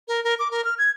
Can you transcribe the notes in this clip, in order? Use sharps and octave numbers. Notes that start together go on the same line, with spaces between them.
A#4
A#4
D6
A#4
F6
G#6